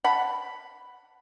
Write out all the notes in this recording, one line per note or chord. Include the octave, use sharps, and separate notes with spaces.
F#5 A5 B5